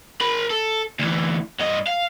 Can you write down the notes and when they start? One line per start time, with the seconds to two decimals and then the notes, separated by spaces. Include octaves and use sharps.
0.21 A#4 B5
0.51 A4
0.99 D2 E3
1.59 G2 D#5
1.87 F5